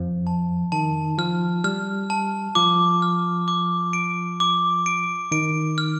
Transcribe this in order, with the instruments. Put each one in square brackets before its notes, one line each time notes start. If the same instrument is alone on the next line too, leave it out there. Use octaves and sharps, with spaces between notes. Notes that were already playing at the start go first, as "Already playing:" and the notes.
Already playing: [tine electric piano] F2 F3
[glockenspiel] A5
[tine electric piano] D#3 D#4 [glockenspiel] A5
[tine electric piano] F3 F4 [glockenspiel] F6
[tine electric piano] G3 G4 [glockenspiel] F6
[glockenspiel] A5
[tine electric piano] F3 F4 [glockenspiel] D6
[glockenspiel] F6
D6
D7
D6
D7
[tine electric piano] D#3 D#4 [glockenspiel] D7
[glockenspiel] F6